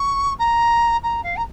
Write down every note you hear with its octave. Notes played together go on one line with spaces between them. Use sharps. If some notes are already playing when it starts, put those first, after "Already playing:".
Already playing: C#6
A#5
A#5
F5
A#5